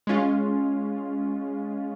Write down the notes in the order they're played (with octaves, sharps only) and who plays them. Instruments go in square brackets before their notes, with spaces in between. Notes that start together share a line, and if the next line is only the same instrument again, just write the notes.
[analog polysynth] G#3 C#4 F4